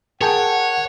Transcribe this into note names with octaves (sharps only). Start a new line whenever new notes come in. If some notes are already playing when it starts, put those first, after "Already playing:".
G#4 A#4 C#5 F#5 G5 A5